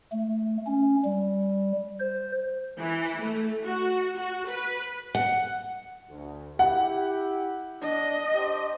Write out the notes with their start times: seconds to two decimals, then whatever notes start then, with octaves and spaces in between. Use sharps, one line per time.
0.12 A3
0.66 C#4
1.04 G3
2.00 C5
2.78 E3
3.20 A3
3.62 F#4
4.16 F#4
4.47 B4
5.15 F#5
6.10 D2
6.59 E4 G4 F#5
7.82 D4 D#5
8.34 D4 G4 C5